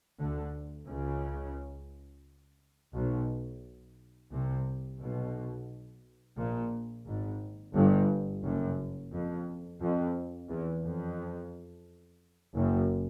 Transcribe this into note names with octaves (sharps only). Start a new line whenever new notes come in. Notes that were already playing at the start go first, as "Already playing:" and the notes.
D2 D3
C#2 C#3
B1 B2
C2 C3
B1 B2
A#1 A#2
G#1 G#2
G1 G2
F#1 F#2
F2
F2
E2
F2
F#1 F#2